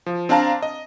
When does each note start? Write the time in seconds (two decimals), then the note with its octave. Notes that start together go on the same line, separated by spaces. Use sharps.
0.06 F3
0.29 C4 D4 D5 F5 A5 A#5
0.62 D#5